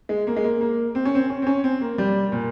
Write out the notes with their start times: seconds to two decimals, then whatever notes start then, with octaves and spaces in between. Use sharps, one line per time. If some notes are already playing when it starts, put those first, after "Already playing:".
0.09 G#3
0.27 A#3
0.36 G#3
0.44 A#3
0.61 A#3
0.95 C4
1.05 C#4
1.15 C4
1.30 C#4
1.42 C4
1.47 C#4
1.64 C4
1.81 A#3
1.98 G3
2.32 A#2